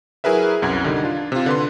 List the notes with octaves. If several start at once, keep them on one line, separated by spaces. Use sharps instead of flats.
F#3 E4 G#4 A#4 B4 E5
C2 F#2 F#5 G#6
D3 D#3 G3 D#4
D4 F4
C3 F4
D3 B4 C6